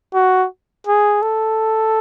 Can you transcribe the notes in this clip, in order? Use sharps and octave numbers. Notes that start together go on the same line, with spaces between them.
F#4
G#4
A4